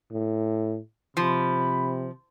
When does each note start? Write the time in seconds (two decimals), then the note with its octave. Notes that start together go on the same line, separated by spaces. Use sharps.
0.12 A2
1.17 C3 F3 B5